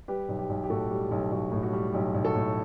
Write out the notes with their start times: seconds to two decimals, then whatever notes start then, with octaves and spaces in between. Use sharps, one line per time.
0.08 G3 G4 B4
0.29 B1
0.39 G4
0.49 B1
0.64 G4
0.70 A2 F#4 A4
0.90 G3
1.11 B1
1.32 B1 F#4
1.52 A2
1.63 F#4
1.73 G3
1.93 B1 G4
2.14 B1
2.24 F#4 A4
2.35 A2